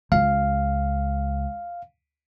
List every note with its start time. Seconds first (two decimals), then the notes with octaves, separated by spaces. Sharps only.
0.12 C#2 F5